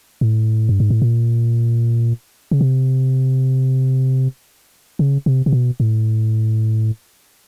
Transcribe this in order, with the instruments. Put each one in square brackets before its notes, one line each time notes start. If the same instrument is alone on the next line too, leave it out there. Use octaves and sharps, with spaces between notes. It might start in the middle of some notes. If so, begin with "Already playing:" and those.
[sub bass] A2
G2
G#2
A2
A#2
C#3
C3
C#3
C3
C3
B2
A2